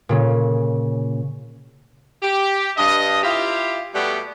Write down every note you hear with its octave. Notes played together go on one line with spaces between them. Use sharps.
A#2 C#3 C#4
G4
G2 D#5
E4 F4 G4
B2 G3 A3 B3 G4